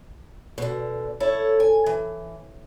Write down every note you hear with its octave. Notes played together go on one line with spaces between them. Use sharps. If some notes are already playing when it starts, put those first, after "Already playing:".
B2 D3
E4 A4 C#5
G#5
E3